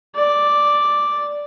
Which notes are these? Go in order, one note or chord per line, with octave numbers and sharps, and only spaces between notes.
D5